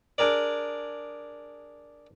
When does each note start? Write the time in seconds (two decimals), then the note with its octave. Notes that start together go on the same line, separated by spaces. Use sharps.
0.18 D4 G#4 A#4 D5